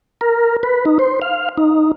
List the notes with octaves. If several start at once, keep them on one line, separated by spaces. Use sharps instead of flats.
A#4
B4
D#4
C5
F5
D#4